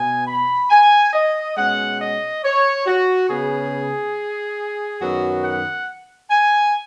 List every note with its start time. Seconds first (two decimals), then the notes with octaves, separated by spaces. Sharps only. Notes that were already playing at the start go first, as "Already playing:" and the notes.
Already playing: B2 B3 G#5
0.28 B5
0.70 G#5
1.13 D#5
1.57 B2 G#3 C#4 F#5
1.99 D#5
2.43 C#5
2.86 F#4
3.28 C#3 B3 G#4
5.00 F#2 D#3 F#3 B3 F#4
5.43 F#5
6.30 G#5